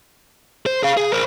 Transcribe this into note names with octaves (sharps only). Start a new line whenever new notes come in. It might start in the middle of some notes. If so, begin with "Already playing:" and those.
C5
G#4 F5
G#4
A#4 C5